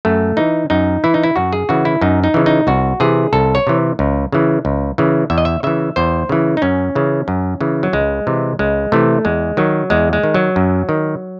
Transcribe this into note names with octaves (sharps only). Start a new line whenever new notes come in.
F#2 A3
E3 D#4
F#2 D#4
E3 E4
D#4
E4
F#2 F#4
G#4
C#3 E3 F#4
E4
F#2 D#4
D#4
C#3 E3
D#4
C2 F#4
C3 E3 G#4
C2 A4
C#5
C3 E3
C#2
C#3 E3
C#2
C#3 E3
E2 E5
D#5
E5
C#3 E3 E5
E2 C5
C#3 E3
D#4
F#2 C#4
C#3 E3
F#2
C#3 E3
F#3
C#2 G#3
C3 E3
C#2 G#3
C3 E3 A3
E2 G#3
D#3 F#3
E2 G#3
G#3
D#3
F#3
F#2
D#3